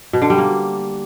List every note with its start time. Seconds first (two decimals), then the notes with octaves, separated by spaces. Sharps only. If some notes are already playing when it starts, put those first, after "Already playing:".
0.13 B2
0.22 D3
0.30 G3
0.38 A#3